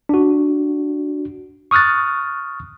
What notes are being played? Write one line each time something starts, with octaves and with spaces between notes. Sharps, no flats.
D4 F#4
C#6 D#6 F6 F#6 A6